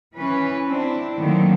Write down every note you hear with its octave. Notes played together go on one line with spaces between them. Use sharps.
E3 C#4 B4
C4 D4 E4
D3 D#3 F#3 A3 A#3 C4